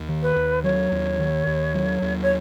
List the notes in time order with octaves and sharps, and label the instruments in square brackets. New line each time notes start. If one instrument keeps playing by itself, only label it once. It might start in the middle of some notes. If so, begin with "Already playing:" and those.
Already playing: [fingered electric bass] D#2
D#3
[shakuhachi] B4
[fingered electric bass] D#2
[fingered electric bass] F#3 [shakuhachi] C#5
[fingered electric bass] D#2
D#3
D#2
F#3
D#2
[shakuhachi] C#5